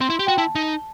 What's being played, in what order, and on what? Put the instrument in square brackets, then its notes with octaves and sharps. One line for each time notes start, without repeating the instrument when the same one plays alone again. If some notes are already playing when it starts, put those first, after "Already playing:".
[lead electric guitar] C4 [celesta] C6
[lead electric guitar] E4
G4
[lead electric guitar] F#4 [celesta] G5
[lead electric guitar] E4 [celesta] A5
[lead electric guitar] D#4